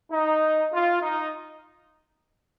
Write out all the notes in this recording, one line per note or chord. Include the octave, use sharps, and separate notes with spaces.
D#4
F4
D#4